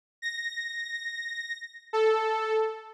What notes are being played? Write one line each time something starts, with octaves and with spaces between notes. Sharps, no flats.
A#6
A4